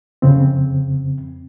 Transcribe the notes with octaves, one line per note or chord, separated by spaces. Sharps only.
F2 C#3 C4